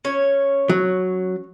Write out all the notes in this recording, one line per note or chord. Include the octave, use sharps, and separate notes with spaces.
C#4 C#5
F#3